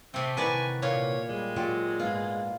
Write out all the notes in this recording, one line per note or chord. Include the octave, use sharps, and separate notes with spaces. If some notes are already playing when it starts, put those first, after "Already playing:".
C3 A3 C4
C3 D#3 E3 F#4 B4 D5 G#5
A#2 C#5
G3 G#3 D5
F#3 F4 G4 D5
G#2 B3 F4